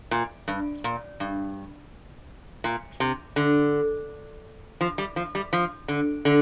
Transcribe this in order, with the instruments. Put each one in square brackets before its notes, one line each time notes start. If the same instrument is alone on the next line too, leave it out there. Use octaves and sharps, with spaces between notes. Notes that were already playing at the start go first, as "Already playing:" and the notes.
[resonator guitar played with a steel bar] A#2
G2
A#2
G2
A#2
C3
D3
F3
G3
F3
G3
F3
D3
D3